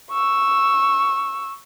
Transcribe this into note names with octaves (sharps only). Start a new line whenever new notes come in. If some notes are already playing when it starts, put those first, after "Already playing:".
C#6 E6